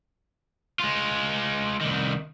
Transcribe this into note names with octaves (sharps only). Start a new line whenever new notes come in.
G#3 F4
C2 D#3